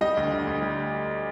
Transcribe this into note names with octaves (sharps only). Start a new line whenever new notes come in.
G3 D#5
D2
D2
D2
G3